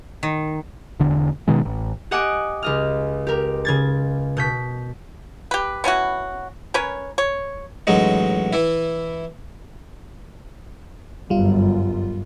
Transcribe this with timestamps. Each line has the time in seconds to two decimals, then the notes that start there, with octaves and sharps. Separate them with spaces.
0.23 D#3
1.00 E1 D3
1.48 B2 D#3 G#3
1.65 A1
2.11 G4 D#5 F#5 G#5 D6 D#6
2.63 C#2 D#5 F6
3.27 G4 A#4
3.65 C#3 G#6 A6
4.37 B2 G6 B6
5.51 G4 B4
5.84 B3 C#4 E4 F#4
6.74 C#4 A#4 B4 C#5
7.18 C#5
7.87 A1 F#3 G#3 D#4
8.53 E3 E4
11.30 G1 F#2 G3 F4